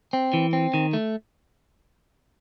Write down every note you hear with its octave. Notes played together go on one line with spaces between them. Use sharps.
C4
E3
C4
D#3
A3